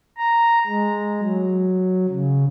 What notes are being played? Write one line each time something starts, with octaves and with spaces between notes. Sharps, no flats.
A#5
G#3
F#3
C#3